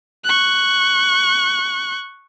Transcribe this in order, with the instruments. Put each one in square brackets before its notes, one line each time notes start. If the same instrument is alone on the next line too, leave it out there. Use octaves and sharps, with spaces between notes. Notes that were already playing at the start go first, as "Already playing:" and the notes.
[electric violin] C#6 F#6